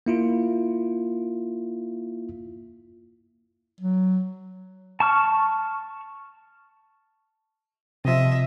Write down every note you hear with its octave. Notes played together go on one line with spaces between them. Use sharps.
A#3 E4 F4
F#3
A5 C#6 F6
C3 F3 D#5 E5